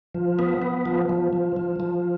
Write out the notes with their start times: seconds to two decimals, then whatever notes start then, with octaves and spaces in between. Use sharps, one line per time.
0.15 F3
0.39 B3
0.62 B3
0.86 F3
1.09 F3
1.33 F3
1.56 F3
1.80 F3